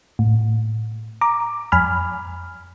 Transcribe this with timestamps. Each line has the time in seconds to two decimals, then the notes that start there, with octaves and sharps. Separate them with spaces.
0.19 A2
1.21 A#5 D6
1.72 F2 G#5 B5 F6